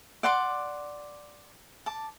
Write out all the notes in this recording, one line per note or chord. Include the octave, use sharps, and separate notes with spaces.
D5 F#5 C6 D6
A5 D6